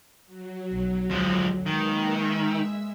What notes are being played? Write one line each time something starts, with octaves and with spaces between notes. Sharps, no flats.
F#3
B1
D2 F3 G#3
D#3 G#3 A#3 B4
E5 E6